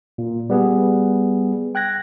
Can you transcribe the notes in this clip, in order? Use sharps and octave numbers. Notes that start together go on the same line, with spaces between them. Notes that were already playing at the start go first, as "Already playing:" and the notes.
A#2
G3 B3 G#4
G5 F#6 G#6 A#6